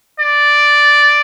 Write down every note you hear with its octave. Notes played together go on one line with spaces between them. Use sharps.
D5